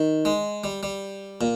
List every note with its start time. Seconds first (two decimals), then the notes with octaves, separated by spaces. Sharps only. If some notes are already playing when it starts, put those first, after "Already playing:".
Already playing: D#3
0.25 G#3
0.64 G3
0.83 G3
1.41 A#2